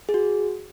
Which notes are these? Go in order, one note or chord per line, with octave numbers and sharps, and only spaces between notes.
G#4
F#4